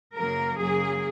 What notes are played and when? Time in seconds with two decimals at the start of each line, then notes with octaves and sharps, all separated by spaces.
0.16 F#2 C#3 F#3 A#3 A#4
0.58 F#2 C#3 F#3 A#3 G#4